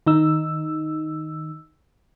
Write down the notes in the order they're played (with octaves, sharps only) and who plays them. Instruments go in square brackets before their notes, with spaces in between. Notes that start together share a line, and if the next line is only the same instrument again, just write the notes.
[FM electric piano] D#3 D#4 E6